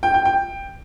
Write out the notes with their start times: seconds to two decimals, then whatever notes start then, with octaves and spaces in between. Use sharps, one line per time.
0.03 G5
0.14 G5
0.25 G5